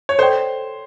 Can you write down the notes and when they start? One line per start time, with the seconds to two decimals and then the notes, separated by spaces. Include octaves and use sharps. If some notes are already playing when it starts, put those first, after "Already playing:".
0.09 C#5
0.18 A4 C5 D5 G5